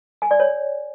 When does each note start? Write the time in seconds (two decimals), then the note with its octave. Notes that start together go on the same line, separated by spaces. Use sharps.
0.22 G#5
0.31 D5
0.40 C#5